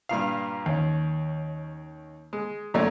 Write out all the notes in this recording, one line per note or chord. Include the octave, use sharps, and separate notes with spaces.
G2 A#2 F5
D#2 C#4
G#3
F#2 A#2 A3 C#5 D5